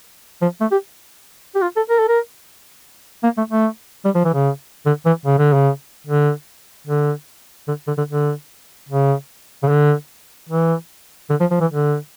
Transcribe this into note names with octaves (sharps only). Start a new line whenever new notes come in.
F3
A3
G4
G4
F4
A4
A#4
A4
A#4
A#3
A3
A3
G3
F3
E3
C#3
D3
E3
C#3
D3
C#3
D3
D3
D3
D3
D3
D3
C#3
C#3
D3
E3
D3
F3
F3
E3
D3